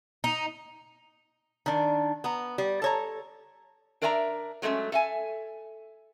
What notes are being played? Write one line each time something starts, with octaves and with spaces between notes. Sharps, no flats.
D#4
D#3 D4
B3 A#5
G3
A4 C#5 A#5
D4 A#4 D5 E5 G#5 A#5
F#3 G#3 A3 C4 C#4
A4 E5 G#5